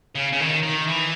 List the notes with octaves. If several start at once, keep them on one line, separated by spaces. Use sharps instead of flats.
C#3
C#3
D#3
D#3
E3